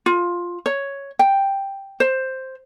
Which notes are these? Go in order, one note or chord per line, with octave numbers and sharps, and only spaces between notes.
F4
C#5
G5
C5